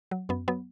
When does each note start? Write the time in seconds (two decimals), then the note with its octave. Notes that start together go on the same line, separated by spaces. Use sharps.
0.11 F#3
0.29 F#2 B3
0.48 F#3 B3